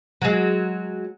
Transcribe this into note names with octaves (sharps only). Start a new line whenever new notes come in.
F#3 G#3